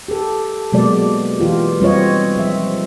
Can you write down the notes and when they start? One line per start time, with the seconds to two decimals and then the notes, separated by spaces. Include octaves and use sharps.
0.08 G4 A4
0.72 B2 F#3 G#3 A#3 D5
1.40 E3 F4 G4
1.81 G3 C4 F4 C#5 D#5
2.36 F3 E5